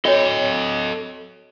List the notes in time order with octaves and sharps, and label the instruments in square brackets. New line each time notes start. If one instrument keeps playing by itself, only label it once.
[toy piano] F#4 C#5 [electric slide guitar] A4 D#5